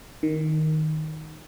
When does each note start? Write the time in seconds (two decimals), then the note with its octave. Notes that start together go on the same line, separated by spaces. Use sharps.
0.23 D#3